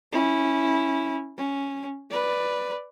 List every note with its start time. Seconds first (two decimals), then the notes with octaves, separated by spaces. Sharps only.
0.12 C#4 E4
1.38 C#4
2.10 B4 D5